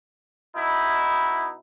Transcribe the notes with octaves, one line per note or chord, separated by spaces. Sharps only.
B2 D#4 E4